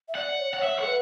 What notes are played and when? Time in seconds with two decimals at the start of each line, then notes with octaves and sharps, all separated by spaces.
0.08 E5
0.15 D5 F#5
0.40 C#5
0.54 F#5
0.63 C#5 E5
0.79 A4 F#5
0.87 B4